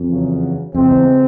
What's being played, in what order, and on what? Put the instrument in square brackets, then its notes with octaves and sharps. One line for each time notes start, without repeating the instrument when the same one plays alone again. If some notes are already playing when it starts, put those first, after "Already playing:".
Already playing: [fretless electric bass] F2
[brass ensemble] E2 C#3 F#3
[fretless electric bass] F2 [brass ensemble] C#3 E3 G#3 C4
[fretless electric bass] E2